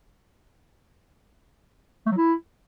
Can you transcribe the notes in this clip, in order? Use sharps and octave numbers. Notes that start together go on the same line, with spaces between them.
A3
F#3
E4